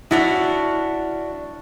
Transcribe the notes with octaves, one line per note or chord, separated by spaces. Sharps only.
C#4 D4 E4 F#4